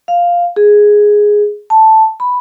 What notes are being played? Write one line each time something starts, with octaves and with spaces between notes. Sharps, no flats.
F5
G#4
A5
B5